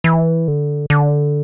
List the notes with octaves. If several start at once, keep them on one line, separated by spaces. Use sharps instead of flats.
E3
D3
D3